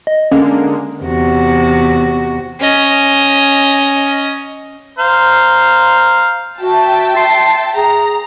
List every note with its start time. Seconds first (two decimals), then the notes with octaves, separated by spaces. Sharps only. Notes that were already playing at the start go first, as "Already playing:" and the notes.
0.07 D#5
0.31 D3 G#3 A#3 C#4
1.03 E2 C3 F#4
2.60 C#4 D#5
4.99 C5 F5 A#5
6.61 F#4 E5 G5 A5
7.17 C6
7.76 G#4 A#5